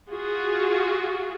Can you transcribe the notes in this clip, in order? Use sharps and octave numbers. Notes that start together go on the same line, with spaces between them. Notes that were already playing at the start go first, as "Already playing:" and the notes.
F4 F#4 G#4